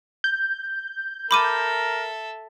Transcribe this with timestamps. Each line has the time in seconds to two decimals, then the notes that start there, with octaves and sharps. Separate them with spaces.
0.24 G6
1.31 A4 A#4 E5 B5 D6 D#7